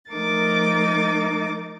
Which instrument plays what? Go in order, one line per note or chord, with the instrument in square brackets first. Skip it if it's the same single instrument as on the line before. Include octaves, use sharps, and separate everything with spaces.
[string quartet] F3 A3 D#4 A#4 D6 A6